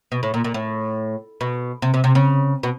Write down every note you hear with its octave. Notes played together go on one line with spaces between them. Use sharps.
B2
A2
A#2
A#2
A2
B2
C3
C3
C3
C#3
B2